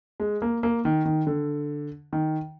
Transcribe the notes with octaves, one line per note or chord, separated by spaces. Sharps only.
G#3
A#3
A#3
D#3
D#3
D3
D#3